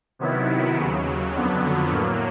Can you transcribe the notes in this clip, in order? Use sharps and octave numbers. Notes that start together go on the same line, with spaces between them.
C3 D#3 F#3 B3 E4
D#2 C#3 F#3
F2 D3 F#3 B3
A2 F#3 A#3